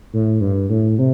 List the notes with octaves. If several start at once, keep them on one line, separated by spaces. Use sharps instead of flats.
A2
G2
A2
C3